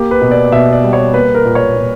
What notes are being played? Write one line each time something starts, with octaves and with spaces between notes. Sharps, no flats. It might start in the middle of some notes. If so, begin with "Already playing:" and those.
Already playing: A#3 G4
B4
B2
D5
B2 E5
D5
G3
C#5
A#3 B4
A#4
A#2
C#5
A#2